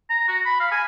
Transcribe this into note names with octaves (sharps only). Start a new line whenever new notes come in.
A#5
F#4
B5
F5
G#5